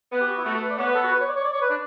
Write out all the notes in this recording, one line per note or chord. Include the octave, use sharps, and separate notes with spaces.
B3 B4
G4
F#4
E4
A3 F#4
A4
B4
D5
B3 C#5
B4
A4
F#4
B4
C#5
D5
C#5
D5
C#5
B4
D4